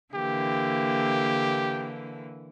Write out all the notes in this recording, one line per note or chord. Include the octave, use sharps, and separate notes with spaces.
D3 E3 A#3 G4